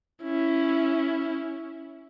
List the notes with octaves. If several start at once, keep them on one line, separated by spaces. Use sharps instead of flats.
C#4 E4